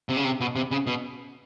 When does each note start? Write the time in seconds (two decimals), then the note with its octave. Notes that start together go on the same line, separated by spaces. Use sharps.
0.09 C3
0.17 C#3
0.24 C3
0.41 B2
0.56 C3
0.71 C#3
0.87 B2